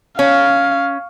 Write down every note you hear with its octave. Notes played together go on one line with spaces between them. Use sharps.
C#4 F5